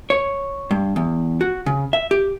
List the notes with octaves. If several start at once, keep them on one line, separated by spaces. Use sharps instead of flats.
C#5
G2
E2
F#4
C#3
E5
G4